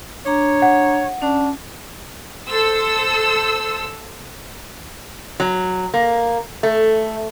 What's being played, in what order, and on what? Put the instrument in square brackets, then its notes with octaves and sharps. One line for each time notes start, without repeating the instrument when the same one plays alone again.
[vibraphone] D4 A#5 [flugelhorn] C#5
[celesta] F#5
[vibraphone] C#4 [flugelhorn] D4
[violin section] A4 C5 E6
[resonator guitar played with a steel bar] F#3
A#3
A3